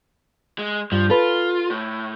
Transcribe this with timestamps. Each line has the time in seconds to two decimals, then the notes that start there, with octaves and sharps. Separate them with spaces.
0.59 G#3
0.92 G2 F3
1.10 F4 A4 B4
1.70 A2